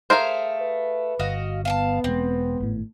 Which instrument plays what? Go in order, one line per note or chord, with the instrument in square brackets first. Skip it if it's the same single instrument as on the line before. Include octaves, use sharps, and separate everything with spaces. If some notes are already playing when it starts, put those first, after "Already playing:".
[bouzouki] A3 F5 [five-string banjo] G#4 A#4 C5
[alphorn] B4
[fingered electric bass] G1 [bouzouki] F#4 D#5 F5
[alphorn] B3 [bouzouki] F5 G#5 A5
[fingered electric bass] E1 G#3 [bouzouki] C4
[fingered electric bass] G#1 A2